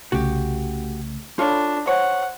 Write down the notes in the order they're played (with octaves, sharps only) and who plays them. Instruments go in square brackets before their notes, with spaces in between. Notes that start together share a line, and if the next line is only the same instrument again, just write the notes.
[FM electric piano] C2 C#3 A3 [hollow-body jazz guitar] F#4 G4
[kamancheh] D4 [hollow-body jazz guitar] F4 C#5 B5 [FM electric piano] A4
[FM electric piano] C5 [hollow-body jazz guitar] C#5 [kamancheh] F#5